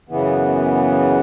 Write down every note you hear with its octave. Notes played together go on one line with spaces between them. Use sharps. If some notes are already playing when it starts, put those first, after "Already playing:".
F#2 C#3 E3 B3